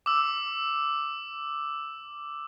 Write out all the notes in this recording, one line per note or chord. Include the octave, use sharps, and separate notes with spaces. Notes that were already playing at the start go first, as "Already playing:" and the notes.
D6 E6